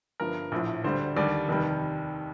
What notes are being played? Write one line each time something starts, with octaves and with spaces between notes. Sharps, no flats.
G1 G2 F3 A#4
A#1 A2 F3
D2 D3 G3 C5
D#2 D3 G3 D5
F1 D#2 D#3 G3